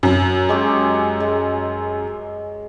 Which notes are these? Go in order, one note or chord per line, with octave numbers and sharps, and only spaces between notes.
F#2
G#3 G4 C#5
G#3